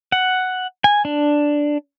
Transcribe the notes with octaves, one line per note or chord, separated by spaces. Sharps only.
F#5
G#5
D4